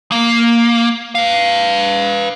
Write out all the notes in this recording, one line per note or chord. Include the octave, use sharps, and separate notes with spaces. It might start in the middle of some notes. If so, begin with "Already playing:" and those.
A#3
B4 F5